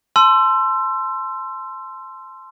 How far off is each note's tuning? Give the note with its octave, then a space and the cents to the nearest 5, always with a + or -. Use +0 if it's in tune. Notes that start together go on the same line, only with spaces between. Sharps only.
A5 -30 C6 +0 E6 +30